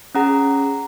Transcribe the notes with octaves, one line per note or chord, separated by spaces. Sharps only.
C#4 G#4 F#5 A#5